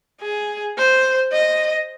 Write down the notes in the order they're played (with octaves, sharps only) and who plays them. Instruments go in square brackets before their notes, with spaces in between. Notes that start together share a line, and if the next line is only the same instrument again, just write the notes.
[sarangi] G#4
C5
D#5